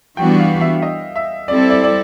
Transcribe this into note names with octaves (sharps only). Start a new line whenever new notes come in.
E3 G3 B3 D4 F#4 G5
F5
E5
D#5
E5
G3 C4 E4 A4 D5
D5
D5